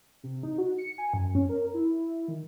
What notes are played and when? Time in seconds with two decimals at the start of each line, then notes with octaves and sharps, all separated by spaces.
0.23 C3
0.43 D#4
0.58 F#4
0.78 C#7
0.98 G#5
1.14 F#2
1.35 C#4
1.49 A#4
1.74 E4
2.28 D#3